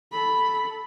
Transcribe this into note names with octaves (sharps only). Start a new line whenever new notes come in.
A4 B5